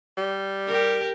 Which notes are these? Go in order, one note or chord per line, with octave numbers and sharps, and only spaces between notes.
G3
G4 A#4